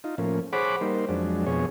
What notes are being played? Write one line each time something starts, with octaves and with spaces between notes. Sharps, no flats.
D#4 F4
A2 F3 A#3 C#4
G#4 C5 C#5 F#5 B5 D6
G3 A#3 D#4 C5
F2 F#3 G#3 D4
F2 B2 G#4 C#5